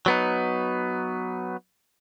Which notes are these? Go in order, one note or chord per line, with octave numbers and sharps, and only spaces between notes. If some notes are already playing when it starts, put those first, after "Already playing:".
F#3 B3 D#4